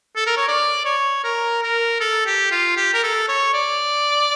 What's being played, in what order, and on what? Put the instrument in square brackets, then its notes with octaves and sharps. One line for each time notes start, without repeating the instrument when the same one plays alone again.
[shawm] A4
A#4
C#5
D5
C#5
A#4
A#4
A4
G4
F4
G4
A#4
A4
C#5
D5